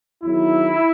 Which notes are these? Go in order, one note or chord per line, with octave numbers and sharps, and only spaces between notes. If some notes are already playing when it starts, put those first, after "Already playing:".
E2 D#3 F#3 E4